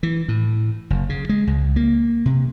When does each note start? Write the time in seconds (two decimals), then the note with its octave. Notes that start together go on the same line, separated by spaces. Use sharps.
0.03 E3
0.28 A2
0.90 F#1
1.09 C#3
1.29 G#3
1.47 C#2
1.76 A#3
2.26 C3